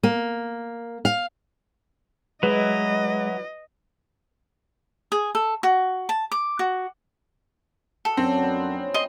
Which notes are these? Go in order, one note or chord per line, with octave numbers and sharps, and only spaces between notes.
A#3
F5
F#3 G#3 E4 B4 D#5
G#4
A4
F#4
A5
D6
F#4
F#4 G#4 A4
F#2 F#3 C4 D4
D3 A#3 B3
F3
C#4
D#5 C6